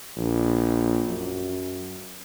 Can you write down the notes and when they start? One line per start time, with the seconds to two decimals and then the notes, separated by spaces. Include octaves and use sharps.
0.16 A#1
1.08 F#2